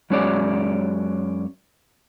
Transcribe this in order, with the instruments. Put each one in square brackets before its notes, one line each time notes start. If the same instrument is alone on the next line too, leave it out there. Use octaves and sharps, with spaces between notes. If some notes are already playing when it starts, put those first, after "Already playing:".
[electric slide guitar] F#2 G#3 C#4 F#4 C#5 D5